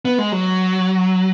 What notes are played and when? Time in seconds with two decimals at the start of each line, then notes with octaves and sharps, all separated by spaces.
0.05 B3
0.19 G#3
0.32 F#3